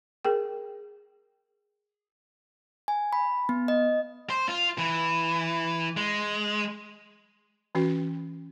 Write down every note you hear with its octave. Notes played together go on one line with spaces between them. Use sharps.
G#4 A#4 G5
G#5
B5
B3
D#5
C5
F4
E3
G#3
E3 C#4 F#4